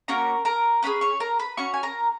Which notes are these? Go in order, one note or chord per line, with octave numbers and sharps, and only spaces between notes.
A#3 C#4 F#4 A#4 A#5
A#4 A#5
C#4 F4 G#4 B4 B5
C#5 C#6
A#4 A#5
B4 B5
C#4 F#4 C#5 C#6
G#5
A#4 A#5